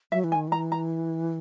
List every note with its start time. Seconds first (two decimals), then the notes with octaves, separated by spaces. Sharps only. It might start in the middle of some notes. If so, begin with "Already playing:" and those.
0.12 F#3 E5
0.24 E3
0.32 G#5
0.35 D#3
0.48 E3 A#5
0.72 A#5